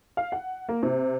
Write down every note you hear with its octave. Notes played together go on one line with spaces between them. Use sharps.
F5
F#5
A#3
C3